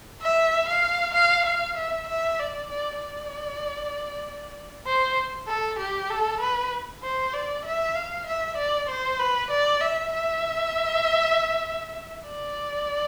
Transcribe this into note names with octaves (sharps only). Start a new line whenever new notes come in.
E5
F5
F5
F5
E5
E5
D5
D5
D5
C5
A4
G4
A4
B4
C5
D5
E5
F5
E5
D5
C5
B4
D5
E5
E5
D5